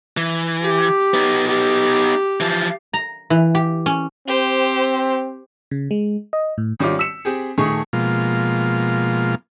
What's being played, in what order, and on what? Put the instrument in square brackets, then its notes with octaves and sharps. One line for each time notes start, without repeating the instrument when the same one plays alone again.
[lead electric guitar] E3
[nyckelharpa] G4
[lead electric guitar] B3 D#4
[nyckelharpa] G4
[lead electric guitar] E3 F3
[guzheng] A#5
E3
G4
C#4
[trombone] C4 [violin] G4 C5
[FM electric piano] C#3
G#3
D#5
A2
[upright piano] G#1 D#3 G3 C#4 F4 D6
E6 B6 C#7 E7
C4 G4 G#4
D#1 D#3 A3 G#4 C#6
[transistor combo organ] B2 F3 G#3 A#3 F4